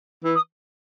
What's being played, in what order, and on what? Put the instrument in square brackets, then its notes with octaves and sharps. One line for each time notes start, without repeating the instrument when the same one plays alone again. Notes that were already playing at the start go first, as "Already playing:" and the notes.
[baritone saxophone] E3
[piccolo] D#6